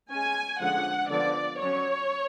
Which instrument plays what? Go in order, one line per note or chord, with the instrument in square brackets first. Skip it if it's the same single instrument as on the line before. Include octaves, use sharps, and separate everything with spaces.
[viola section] G#3 C#4 G#5
D3 F3 G#3 C#4 F#5
D3 F3 B3 D4 D5
F#3 C#4 C#5